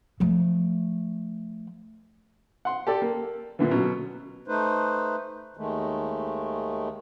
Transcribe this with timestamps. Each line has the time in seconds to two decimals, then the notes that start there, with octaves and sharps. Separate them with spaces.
0.20 F3 A3
2.65 F#5 C6
2.87 G4 A4 D5
3.02 A#3
3.59 A#2 D3 E3
3.71 B2 F#3 C#4
4.48 A3 D#4 B4 C5
5.57 D#2 D#3 G#3 A3